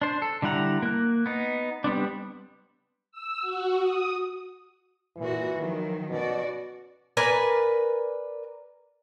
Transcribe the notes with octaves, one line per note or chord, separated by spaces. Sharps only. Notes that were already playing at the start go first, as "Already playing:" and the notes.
D4 C5
A4
D3 G3 E4 F#5 A#5
A#3 F#6
B3 D#4
G3 B3 C4 D4
E6
F#4
D#6
A#2 E3 F#4
D#3 F3 F#3
B2 C#4 F#4 D5
A#4 B4 D5 G#5